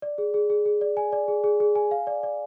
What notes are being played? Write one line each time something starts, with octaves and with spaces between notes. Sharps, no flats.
D5
G#4
G#4
G#4
G#4
D5
G#5
D5
G#4
G#4
G#4
G#5
F5
D5
D5